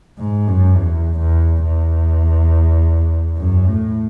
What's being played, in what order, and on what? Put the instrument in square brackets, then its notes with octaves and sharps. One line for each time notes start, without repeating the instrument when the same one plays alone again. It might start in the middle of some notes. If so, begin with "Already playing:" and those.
[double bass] G#2
F#2
E2
E2
E2
F#2
A2